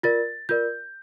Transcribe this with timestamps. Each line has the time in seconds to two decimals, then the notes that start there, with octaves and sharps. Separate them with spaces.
0.03 F4 A#4 D5 A6
0.49 F4 A#4 D5 G6